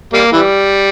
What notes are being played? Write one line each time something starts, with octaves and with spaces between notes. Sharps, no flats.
G3 A#3
E3 G3